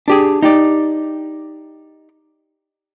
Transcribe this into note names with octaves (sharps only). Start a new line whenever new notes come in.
D4 G4 G#4
D#4 G4 D5